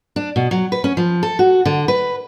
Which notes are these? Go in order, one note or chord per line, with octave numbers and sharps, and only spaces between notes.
D4
B2
F#3
B4
C#4
F3
A4
F#4
D3
B4